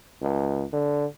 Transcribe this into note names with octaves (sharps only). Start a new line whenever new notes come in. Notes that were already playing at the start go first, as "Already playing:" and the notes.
C#2
D3